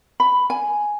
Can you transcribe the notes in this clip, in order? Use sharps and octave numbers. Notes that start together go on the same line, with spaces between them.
B5
G#5